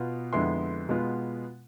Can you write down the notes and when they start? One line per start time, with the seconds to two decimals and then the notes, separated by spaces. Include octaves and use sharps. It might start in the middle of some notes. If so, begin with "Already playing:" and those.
Already playing: B2 B3 F4
0.33 F2 D3 G#3 B3 E4 C6
0.89 B2 G#3 B3 F4